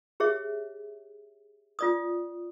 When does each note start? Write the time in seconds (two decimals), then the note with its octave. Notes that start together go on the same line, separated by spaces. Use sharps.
0.20 G4 G#4 C#5 E5
1.79 F4 D5 D#6